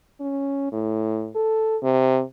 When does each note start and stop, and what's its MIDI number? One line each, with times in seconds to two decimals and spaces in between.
0.20 0.68 61
0.72 1.30 45
1.35 1.77 69
1.83 2.22 48